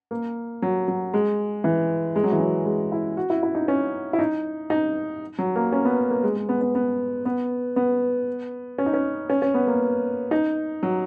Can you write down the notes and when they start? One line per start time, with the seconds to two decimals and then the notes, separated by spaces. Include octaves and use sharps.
0.11 A#3
0.62 F#3
0.88 F#3
1.14 G#3
1.64 E3
2.16 G#3
2.23 F#3
2.32 E3
2.40 F#3
2.66 G#3
2.92 E4
3.17 F#4
3.30 E4
3.43 E4
3.55 D#4
3.68 C#4
4.13 E4
4.19 D#4
4.70 D#4
5.38 F#3
5.56 A#3
5.72 C#4
5.85 B3
6.11 A#3
6.23 G#3
6.36 G#3
6.49 B3
6.61 B3
6.75 B3
7.25 B3
7.76 B3
8.78 C#4
8.86 D#4
8.94 C#4
9.30 C#4
9.42 C#4
9.54 B3
9.67 A#3
10.31 D#4
10.83 F#3